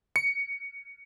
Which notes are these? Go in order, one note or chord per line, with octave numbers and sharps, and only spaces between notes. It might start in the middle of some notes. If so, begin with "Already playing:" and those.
C#7